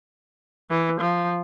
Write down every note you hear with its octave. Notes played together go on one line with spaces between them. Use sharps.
E3
F3